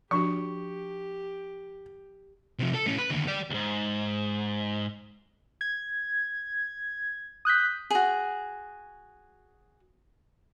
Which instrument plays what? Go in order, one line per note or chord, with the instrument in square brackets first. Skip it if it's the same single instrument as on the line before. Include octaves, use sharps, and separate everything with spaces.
[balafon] F3 D4 F#4 [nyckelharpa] G4 [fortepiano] C#6
[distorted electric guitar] C3 F3
A4
A2 C#4
B4
D#2 D3
G4 D5
D2 G#2
[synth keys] G#6
D#6 F#6 G6 B6
[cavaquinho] F#4 G#4